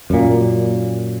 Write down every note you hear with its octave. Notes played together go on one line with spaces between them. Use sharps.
F#2 A#2